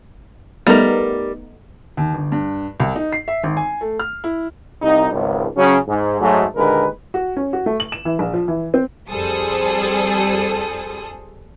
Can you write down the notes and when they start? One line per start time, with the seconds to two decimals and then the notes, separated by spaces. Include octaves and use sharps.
0.67 G3 A3 B3 D#4 A#4
1.97 D#2
2.13 G1
2.32 G2
2.80 C2
2.96 D#4
3.13 C7
3.28 E5
3.43 G#1
3.57 G#5
3.81 A3
3.99 F6
4.24 E4
4.82 C2 D#4
5.12 G#1 C#2
5.57 C#3 F#3 C#4
5.88 G#2
6.21 G#2 F#3 A3
6.55 D#2 A#2 D3 G#3 A#4 B4
7.14 F#4
7.37 C#4
7.53 F#4
7.66 A3
7.80 F#7
7.92 E7
8.05 E3
8.19 A#1
8.34 F3
8.48 E3
8.74 C4
9.10 F2 G3 G#4 A4 C5 D#6